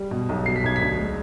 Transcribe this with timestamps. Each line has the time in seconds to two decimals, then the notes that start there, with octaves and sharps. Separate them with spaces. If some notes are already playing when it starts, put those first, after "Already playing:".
Already playing: G3
0.11 B2
0.29 B1
0.46 B2 C7
0.56 B6
0.64 B1 G#6
0.76 D2 B6
0.98 G#3